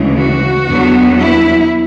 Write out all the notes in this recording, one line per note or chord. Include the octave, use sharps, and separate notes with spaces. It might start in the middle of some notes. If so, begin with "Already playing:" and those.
Already playing: D2 C#3 E3 G#3
F#4
E2 D3 F#3 B3
E4